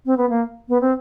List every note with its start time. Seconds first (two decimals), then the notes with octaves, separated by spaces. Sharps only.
0.06 C4
0.17 B3
0.29 A#3
0.69 B3
0.81 C4